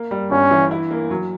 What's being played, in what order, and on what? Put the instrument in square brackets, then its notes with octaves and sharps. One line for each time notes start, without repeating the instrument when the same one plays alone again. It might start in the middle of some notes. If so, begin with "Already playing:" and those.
Already playing: [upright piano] A#3
G3
[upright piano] G1 [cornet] C#4
[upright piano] E3
E4
A#3
F#3